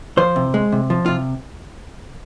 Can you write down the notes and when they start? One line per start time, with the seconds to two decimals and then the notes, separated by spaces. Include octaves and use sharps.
0.17 F3 C5
0.36 C3
0.54 G#3
0.72 C3
0.90 F3
1.06 C3 F4